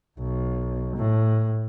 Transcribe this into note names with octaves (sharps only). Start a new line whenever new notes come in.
B1
A2